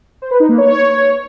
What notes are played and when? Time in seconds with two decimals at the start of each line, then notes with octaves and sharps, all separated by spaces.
0.22 C5
0.31 B4
0.40 D#4
0.49 A#3
0.58 C#5